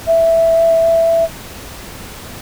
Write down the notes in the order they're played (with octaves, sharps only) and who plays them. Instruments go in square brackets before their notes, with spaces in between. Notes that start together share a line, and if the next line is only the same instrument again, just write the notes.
[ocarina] E5